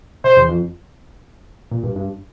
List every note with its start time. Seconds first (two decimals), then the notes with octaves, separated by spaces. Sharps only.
0.24 C3 C5
0.37 E2
0.49 F2
1.71 A#2
1.83 G2
1.96 G2